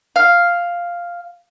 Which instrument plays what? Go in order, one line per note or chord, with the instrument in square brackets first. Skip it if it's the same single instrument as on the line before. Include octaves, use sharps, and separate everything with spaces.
[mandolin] F5